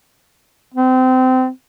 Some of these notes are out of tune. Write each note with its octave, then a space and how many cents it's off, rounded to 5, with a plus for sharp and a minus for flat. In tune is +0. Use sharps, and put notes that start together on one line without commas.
C4 -25